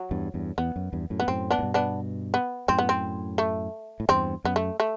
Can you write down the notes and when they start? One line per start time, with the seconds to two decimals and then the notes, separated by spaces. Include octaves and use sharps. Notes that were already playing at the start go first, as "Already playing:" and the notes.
Already playing: F#3
0.11 E2 G2
0.34 E2 G2
0.58 E2 B3
0.76 F#2
0.93 E2 G2
1.10 F#2 A2
1.20 B3
1.28 F#2 A2 C4
1.51 B3 D4
1.59 A2
1.62 G2 B2
1.74 B3 D4
2.34 B3
2.68 F#2 A2 C4
2.79 B3
2.89 C4
3.38 A3
4.00 A2
4.09 E2 G2 C4
4.44 F#2 B3
4.56 A3
4.80 A3